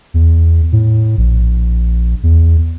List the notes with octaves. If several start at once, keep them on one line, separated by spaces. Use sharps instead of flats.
E2
A2
A#1
E2